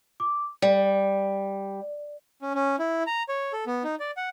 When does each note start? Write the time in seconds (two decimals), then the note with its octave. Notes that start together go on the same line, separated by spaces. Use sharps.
0.20 D6
0.62 G3
2.42 C#4
2.54 C#4
2.79 E4
3.07 A#5
3.29 C#5
3.53 A4
3.67 B3
3.84 D#4
4.00 D5
4.17 F#5